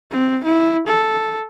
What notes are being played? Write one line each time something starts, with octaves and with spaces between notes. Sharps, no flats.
C4
E4
A4